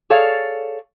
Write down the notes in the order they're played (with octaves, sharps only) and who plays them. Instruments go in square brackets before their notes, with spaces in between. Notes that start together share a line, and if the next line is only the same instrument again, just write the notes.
[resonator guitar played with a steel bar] G#4 A4 C#5 D5 F5